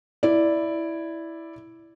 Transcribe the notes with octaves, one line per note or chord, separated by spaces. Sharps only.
E4 D5